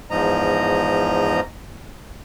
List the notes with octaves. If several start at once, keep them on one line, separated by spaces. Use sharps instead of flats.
E2 G#2 F3 D#5 A#5